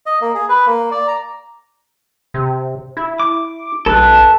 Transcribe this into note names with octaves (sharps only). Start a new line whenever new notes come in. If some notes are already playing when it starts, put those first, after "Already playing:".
D#5
A#3
G#4
B4
A#3
D5
A#5
C3
E4
D6
B1 A4 B4